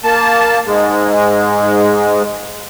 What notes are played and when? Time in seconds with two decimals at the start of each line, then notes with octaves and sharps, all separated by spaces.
0.04 A#3 A5
0.66 G#2 G#3